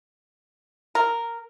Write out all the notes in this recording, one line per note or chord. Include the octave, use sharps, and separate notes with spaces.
A#4